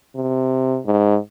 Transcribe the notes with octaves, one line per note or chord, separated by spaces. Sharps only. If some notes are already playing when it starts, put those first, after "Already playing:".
C3
G#2